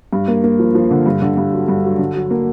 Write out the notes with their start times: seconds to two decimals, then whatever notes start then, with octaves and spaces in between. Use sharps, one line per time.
0.13 G2
0.28 A#3
0.44 A#3
0.59 F3
0.75 F3
0.91 D3
1.06 G2
1.22 D3
1.37 G2
1.53 F#3
1.68 G2
1.84 F#3
1.99 D3
2.15 F#3
2.31 A#3